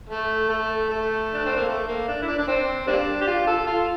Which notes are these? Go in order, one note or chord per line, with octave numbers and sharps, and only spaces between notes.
A3
A3
A3
D4
C4
A#3
A3
A#3
D4
E4
D4
D4
C4
G3 A#3 D4
G4
F4
A4
F4